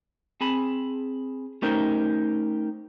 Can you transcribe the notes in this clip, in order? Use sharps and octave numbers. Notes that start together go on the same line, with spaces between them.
C4 G#4 A5 B5
A3 C#4 D#4 G4 A#4 C5